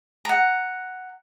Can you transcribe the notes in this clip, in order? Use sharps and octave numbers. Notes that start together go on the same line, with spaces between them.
F#5 A#5